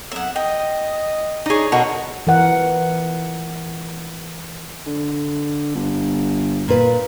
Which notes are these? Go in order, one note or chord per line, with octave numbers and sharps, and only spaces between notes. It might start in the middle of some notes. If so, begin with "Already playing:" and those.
F2 F#3 B3 E5 F#5
D#5 G5
D#4 G#4 C#5 D5
B2 F#4 A4 A#4 D#5
E3 A#4 F#5
D3
G1
A#2 B4